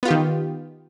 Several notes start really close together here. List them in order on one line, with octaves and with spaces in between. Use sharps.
B3 F4 G4 D#3